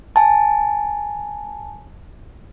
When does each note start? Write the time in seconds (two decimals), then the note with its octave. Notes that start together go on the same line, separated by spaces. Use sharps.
0.16 G#5 A5